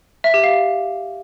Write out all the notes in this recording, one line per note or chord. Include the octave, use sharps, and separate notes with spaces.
E5
G4
F5